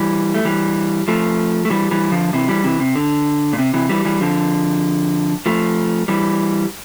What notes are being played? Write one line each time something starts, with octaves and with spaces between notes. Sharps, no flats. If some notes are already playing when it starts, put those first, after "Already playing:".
Already playing: E3 G3
A3
E3 G3
F3 A3
A3
E3 G3
E3 G3
D3 F3
C3 E3
E3 G3
C3 E3
C3
D3
A#2
C3
C3 E3
E3 G3
E3 G3
D3 F3
F3 A3
E3 G3